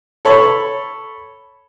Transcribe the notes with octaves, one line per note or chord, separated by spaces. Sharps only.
A4 C#5 B5